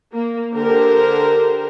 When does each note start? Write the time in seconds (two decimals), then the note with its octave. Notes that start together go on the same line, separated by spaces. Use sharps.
0.15 A#3
0.54 D3 G4 A#4 C5